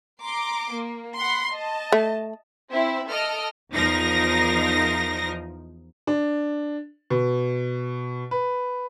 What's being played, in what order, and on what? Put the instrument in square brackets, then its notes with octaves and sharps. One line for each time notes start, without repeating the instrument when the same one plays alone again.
[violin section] A#5 C6 D6
A#3
F#5 B5 C6
D#5 A5
[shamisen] A3
[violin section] C4 E4 E5
A4 D#5 F6 D7
[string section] E2 F3 D#4 A#4 A#6
[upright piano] D4
B2
B4